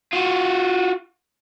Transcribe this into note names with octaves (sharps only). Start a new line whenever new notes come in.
F4 F#4